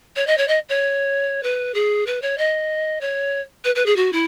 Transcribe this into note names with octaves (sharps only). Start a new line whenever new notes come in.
C#5
D#5
C#5
D#5
C#5
B4
G#4
B4
C#5
D#5
C#5
B4
B4
G#4
F#4
E4